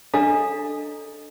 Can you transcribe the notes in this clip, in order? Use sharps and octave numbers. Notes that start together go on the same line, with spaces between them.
D4 A4 D#5 F5 A#5